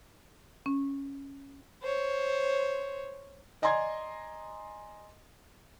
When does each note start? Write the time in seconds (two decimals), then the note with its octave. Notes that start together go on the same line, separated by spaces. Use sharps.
0.66 C#4
1.82 C5 C#5
3.62 D5 D#5 G#5 A#5 C6 G#6